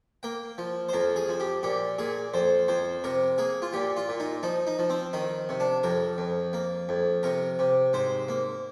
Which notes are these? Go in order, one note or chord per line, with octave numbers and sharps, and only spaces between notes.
A#3 G5
F3
C5
F2 A#4
G#4
F3
G4
A#2 G4
A#2 G#4
F2 C5
F2 C5
C3 A#4
A#3 G#4
F4
A#2 G4
F4
A#2
D#4
F3 D#4
D#4
F3
C4
D#3 D#4
C3
D4
F2 A#4
F2
A#3
F2
C3 A#4
C3
G#2 C5
A#3